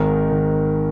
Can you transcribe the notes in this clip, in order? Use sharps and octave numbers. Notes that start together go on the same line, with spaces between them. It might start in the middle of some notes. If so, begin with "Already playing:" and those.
Already playing: G#1 G#2 D#3 A#4
D#3